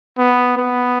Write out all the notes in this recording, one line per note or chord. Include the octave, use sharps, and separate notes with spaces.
B3
B3